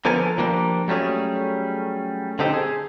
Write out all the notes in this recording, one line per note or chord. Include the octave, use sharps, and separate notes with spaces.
D3 F3 B3 A4 A#4 G#5
F3 G3 A#3 D4
F#3 G3 A3 C#4 G#4
D3 C4 D#4 G4 A4
G#4